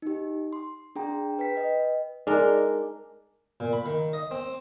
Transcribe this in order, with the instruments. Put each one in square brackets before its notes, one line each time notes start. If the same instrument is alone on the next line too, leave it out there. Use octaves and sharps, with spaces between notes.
[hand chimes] D#4 G4
C6
D4 G#4 G5 A#5
B4 G5 B6
B4 D#5
[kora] G#3 D4 A#4 [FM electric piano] D#4 G#4 D5
[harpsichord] A#2
B5
D#3
D#5
C4